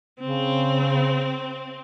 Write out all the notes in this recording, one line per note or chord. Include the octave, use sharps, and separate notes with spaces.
C#3 C4